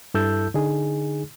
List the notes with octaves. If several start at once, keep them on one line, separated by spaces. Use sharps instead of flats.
G2 E4 A4 A5 E6 G6
D3 D#4 G#4